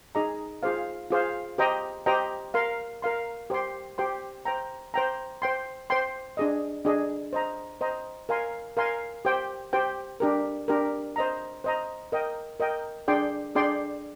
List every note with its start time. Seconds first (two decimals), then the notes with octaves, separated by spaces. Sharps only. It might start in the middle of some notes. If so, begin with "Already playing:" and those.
0.15 D#4 G#4 D#5 A#5
0.63 F4 G#4 C5 F5
1.11 F4 G#4 C5 F5
1.58 G4 C5 D#5 G5 A#5
2.06 G4 C5 D#5 G5 A#5
2.54 A#4 F5 C6
3.02 A#4 F5 C6
3.50 G4 C5 G5 C6
3.98 G4 C5 G5 C6
4.45 C5 G5 A#5
4.94 C5 G5 A#5
5.42 C5 G5 C6
5.90 C5 G5 C6
6.37 D4 G#4 D#5
6.85 D4 G#4 D#5
7.33 C5 D#5 A#5
7.81 C5 D#5 A#5
8.29 A#4 F5 G#5 C6
8.77 A#4 F5 G#5 C6
9.25 G4 C5 G5
9.73 G4 C5 G5
10.20 D4 G4 A#4
10.68 D4 G4 A#4
11.16 C5 D#5 A#5
11.64 C5 D#5 A#5
12.12 A#4 D#5 G5
12.60 A#4 D#5 G5
13.08 D4 G#4 D5 G5 C6
13.55 D4 G#4 D5 G5 C6